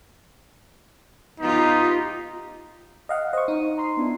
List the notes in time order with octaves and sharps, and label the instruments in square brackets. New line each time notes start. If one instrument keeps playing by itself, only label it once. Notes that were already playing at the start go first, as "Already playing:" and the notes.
[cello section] B3 F4 G4 [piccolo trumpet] D#4
[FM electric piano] D#5 F5 F#5
[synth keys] C5 [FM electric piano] D#5 C#6
[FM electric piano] D#4 [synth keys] D#7
[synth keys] A#5 C6 C7
B3 D4 E4